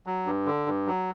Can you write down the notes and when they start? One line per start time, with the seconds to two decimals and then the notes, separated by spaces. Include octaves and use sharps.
0.06 F#3
0.26 G2
0.46 D3
0.66 G2
0.87 F#3